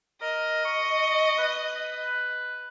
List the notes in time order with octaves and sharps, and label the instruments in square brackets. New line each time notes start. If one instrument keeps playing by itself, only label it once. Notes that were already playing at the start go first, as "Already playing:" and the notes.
[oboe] A#4 [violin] D#5
[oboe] C#6
B4